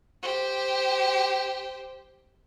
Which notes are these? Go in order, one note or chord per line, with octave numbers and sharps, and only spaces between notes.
G4 C5